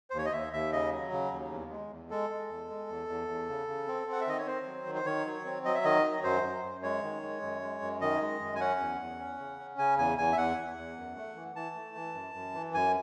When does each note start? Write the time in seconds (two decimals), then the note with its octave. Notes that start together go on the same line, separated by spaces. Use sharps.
0.10 C5
0.14 D#2 C#5
0.25 D#5
0.33 D#2 E5
0.53 D#2 E5
0.72 C#3 D#5
0.92 F#3
1.12 C#3
1.31 D#2
1.51 E2
1.71 G#3
1.91 E2
2.10 G#3 A4
2.30 G#3
2.49 E2
2.69 G#3
2.89 E2
3.09 E2
3.28 E2
3.49 C#3
3.68 C#3
3.87 C4
4.07 C4 F#5
4.21 E5
4.27 D#3 D#5
4.39 C#5
4.47 C4 C5
4.66 F#3
4.86 D#3
4.95 C5
5.05 D#3 C#5
5.25 F#3
5.45 C4
5.65 F#3 D#5
5.75 E5
5.84 D#3 D#5
6.04 F#3
6.24 F#2 C5
6.43 F#2
6.64 F#2
6.83 G#3 C#5
7.03 D#3
7.22 G#3
7.42 F#2
7.62 G#3
7.82 F#2
8.01 D#3 D#5
8.21 G#3
8.41 F#2
8.55 G#5
8.60 C#4 F#5
8.80 E2
9.00 E2
9.19 C#4
9.39 C#3
9.59 C#4
9.78 C#3 G#5
9.98 E2 G#5
10.18 E2 G#5
10.33 E5
10.37 E2 F#5
10.57 E2
10.77 E2
10.97 F#2
11.16 A3
11.36 E3
11.56 E3 A5
11.75 A3
11.95 E3
12.14 F#2
12.34 F#2
12.55 E3
12.74 F#2 G#5